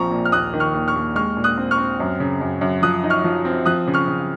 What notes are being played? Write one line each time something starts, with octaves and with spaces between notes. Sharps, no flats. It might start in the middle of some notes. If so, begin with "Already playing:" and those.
Already playing: A#1 F3 C4 A#5 C#6
A#2
F6
D#2 D#6 F#6
D#3
C#6 F6
D#2
C#6 F6
D#2
G#3 C#6 F6
A#2
D#6 F#6
C4
C#6 F6
C4
F#2
C#3
F#2
F#2
F3 D#6 F#6
D#4
C#6 F6
F3
C4
F3 D#6 F#6
C#3
C#6 F6
C#3